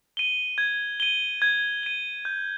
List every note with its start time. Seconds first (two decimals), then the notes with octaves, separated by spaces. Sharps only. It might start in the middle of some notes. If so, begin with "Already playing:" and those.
0.17 D#7 G7
0.58 G#6
1.00 D#7 G7
1.42 G#6
1.83 D#7 G7
2.25 G6